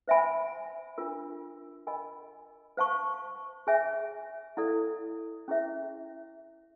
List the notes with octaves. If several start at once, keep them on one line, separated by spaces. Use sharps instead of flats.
C5 E5 G#5 B5
D4 F4 A#4
A#4 D#5 G#5 B5
C5 F5 A5 C#6
G#4 C#5 E5 G#5
E4 A4 D5 F5
C#4 E4 G#4 C#5 E5